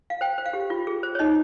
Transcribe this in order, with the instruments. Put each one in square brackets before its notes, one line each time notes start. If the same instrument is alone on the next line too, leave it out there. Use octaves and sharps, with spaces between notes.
[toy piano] F5
C5 G5
C5
F5
G4
F4
G#4
C5
C#5
D#4 D#5